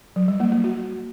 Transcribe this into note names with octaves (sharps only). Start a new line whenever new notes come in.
F#3
G3
A#3
A#3
F#4